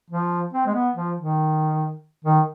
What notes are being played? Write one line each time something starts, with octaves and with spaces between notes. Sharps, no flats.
F3
C4
G#3
B3
F3
D#3
D#3